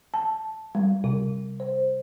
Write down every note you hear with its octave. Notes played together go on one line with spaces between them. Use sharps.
A5
G3
C3
C5